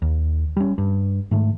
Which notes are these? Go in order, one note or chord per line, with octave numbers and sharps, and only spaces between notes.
D#2
G3 C#4
G2
G#2 D#3 A3